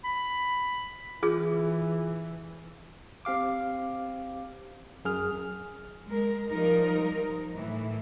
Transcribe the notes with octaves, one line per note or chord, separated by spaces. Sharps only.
B5
E3 F4 G#4
C4 G4 F5 D6
F#2 G#4 F6
G#3 A#4
F3 G3 D#4 A#4
A2 E3